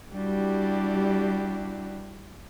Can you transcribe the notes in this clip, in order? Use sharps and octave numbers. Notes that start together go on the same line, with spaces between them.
G3 D4 E4 F#4 G4